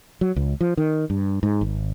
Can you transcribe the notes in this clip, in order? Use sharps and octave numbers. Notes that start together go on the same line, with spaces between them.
F#3
C#2
F3
D#3
G2
G#2
G#1